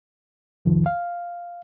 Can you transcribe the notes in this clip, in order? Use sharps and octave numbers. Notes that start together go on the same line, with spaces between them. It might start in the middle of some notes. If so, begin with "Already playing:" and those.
C2 F2 D#3 F3
F5